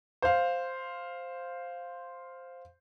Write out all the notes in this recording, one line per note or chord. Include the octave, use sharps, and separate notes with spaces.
C5 F5